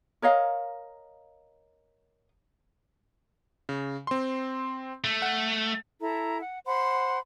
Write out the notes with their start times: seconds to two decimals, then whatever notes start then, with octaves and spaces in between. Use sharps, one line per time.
0.22 A#4 C#5 D#5 F5
3.69 C#3
4.07 C4 C6
5.04 A3
5.22 F#5
6.01 E4 A4 A#5
6.40 F#5
6.66 C5 F#5 B5 C6